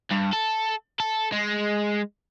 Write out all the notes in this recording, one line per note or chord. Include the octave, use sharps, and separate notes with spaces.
G2
A4
A4
G#3